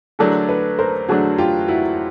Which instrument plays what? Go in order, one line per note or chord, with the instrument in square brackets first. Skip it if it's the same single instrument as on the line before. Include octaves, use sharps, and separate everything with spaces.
[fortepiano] D3 F#3 A3 D4 [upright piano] G#4 A#4
[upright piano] A4 B4
A#4 C5
[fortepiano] D3 F#3 A3 D4 [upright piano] F#4 G#4
[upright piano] F4 G4
E4 F#4